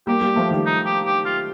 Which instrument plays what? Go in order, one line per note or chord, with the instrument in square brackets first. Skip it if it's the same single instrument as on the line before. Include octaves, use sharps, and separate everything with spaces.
[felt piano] G3 A#3 [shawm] G4
[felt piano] G3 A#3
F3 A3
D#3 G3
[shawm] D#4
G4
G4
F4